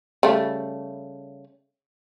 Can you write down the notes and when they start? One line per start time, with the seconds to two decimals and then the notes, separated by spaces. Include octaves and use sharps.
0.23 C#3 G3 A3